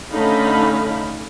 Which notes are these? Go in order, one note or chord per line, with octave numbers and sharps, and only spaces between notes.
D3 A3 C#4 D#4 F5 B5